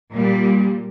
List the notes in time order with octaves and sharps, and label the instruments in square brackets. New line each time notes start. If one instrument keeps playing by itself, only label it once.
[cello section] A#2 G3